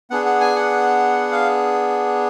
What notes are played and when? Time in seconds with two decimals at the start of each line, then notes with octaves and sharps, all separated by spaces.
0.10 B3 D4 G#4 F#5
0.26 F#5
0.41 G#5
0.55 F#5
1.32 F5